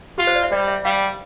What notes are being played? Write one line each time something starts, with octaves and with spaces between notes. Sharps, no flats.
F4 G4
C5
D5
E5
G3 D5
E5
G3 F5